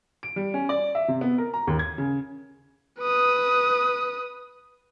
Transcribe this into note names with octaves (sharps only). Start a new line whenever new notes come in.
D7
G3
C#4
D5
E5
C3
B3
A#4
A#5
D#2
G#6
C#3
B4 D#6